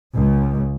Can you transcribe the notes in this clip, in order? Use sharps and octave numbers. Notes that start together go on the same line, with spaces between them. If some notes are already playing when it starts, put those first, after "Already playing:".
C#2